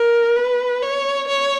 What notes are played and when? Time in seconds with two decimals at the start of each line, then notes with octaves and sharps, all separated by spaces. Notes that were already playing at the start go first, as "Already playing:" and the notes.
Already playing: A#4
0.36 B4
0.82 C#5
1.28 C#5